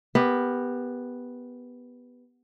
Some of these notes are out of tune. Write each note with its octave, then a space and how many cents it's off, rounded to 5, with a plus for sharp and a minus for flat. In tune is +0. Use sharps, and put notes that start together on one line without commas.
B3 +0 G4 +15 A#4 +0